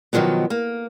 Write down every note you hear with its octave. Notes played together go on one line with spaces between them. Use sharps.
B2 D#3 F3 F#3 B3
A#3